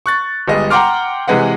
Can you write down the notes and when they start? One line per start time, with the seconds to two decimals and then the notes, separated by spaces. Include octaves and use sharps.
0.06 C#6 F#6 A6
0.48 G1 G3 G#3 D#5
0.70 F#5 G5 A#5 C6 D6 F6
1.28 C3 E3 G#3 B4 F#5